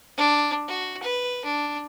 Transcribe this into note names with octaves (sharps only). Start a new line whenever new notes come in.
D4
F#4
B4
D4